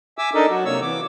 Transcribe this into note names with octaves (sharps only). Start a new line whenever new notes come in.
E5 G#5 D6 E6
D4 D#4 A4 A#4 D5 D#5
F#3 F#4
C3 A#3 C#5 E6
E3 D6